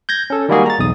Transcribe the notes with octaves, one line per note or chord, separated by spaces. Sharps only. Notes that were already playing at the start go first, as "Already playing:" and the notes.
G6 G#6 A#6
C#4 A4
D#3 G3 G#3 A#3 F#4 G#4
A#5 A6
B1 E2 D#6